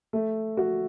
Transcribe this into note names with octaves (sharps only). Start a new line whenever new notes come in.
A3
F#4